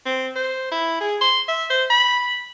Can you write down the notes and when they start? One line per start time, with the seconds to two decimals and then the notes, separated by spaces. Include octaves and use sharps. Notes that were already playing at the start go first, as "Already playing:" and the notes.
0.06 C4
0.36 C5
0.72 E4
1.01 G#4
1.21 C6
1.48 E5
1.70 C5
1.90 B5